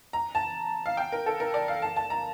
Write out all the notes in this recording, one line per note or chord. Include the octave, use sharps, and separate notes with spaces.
A#5
A5
F5
G5
A#4
A4
A#4
D5
F5
A5
A5
A#5